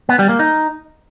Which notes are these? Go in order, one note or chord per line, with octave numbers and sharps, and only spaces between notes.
B3
G3
A#3
D#4